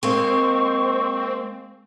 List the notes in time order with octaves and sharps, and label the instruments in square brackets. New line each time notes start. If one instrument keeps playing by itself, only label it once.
[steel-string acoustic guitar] G#3 A#3 [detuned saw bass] C4 [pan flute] C#6